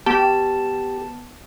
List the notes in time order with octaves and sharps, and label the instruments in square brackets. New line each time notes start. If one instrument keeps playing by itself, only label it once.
[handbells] B3 A5 [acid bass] G4